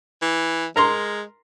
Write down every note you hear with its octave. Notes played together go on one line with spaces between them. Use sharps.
E3
G#3 A#4 A#5 C6